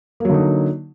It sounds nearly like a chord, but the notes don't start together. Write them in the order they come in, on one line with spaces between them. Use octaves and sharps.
A#3 F#3 D3 D#4